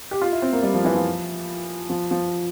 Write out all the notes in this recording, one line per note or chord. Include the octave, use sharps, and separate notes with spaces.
G4
F4
E4
C4
A#3
G3
F3
E3
F3
F3
F3